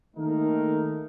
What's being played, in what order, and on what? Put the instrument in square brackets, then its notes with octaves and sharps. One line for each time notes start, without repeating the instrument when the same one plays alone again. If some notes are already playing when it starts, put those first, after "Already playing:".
[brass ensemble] D#3 A3 A#3 D#4 A4 A#4